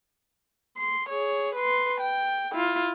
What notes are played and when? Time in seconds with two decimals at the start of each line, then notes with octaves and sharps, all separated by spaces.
0.77 C6
1.09 G#4 C#5
1.55 B4 C6
2.01 G5
2.52 E4 F4